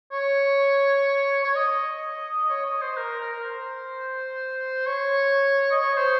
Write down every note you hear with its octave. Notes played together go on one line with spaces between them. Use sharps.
C#5
C#5
D#5
C#5
D#5
C5
A#4
A#4
C5
C#5
D#5
C#5
C5